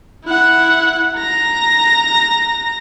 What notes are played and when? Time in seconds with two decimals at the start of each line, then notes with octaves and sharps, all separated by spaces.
0.25 E4 F#5
1.16 A#5 A#6